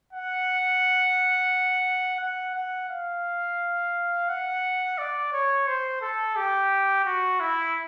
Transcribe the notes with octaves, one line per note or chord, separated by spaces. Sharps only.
F#5
F#5
F#5
F5
F#5
D5
C#5
C5
A4
G4
F#4
E4